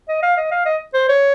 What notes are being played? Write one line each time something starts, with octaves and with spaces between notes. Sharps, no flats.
D#5
F5
D#5
F5
D#5
C5
C#5